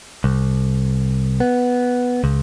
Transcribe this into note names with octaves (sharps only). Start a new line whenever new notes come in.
C2
B3
C#2